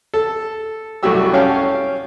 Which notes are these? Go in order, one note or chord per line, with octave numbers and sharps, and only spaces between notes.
A4
C2 F#2 A3 F#4 G4 E6
C#4 C#5 F5 G5 A5